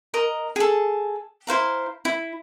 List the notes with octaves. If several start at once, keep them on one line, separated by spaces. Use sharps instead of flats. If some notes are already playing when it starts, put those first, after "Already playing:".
A#4 D#5 A#5
G#4 A4
E4 C5 F5 A#5
E4